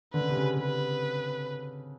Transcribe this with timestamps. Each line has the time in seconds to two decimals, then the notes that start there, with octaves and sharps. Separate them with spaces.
0.13 D3 B4
0.21 C#3
0.30 C3
0.37 C#3
0.57 C3 B4